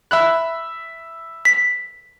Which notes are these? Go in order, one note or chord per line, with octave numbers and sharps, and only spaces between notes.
E5 B5 F#6
B6